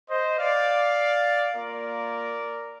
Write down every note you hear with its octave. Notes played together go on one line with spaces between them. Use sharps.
C5 D#5
D5 F5
A#3 F4 A#4 D5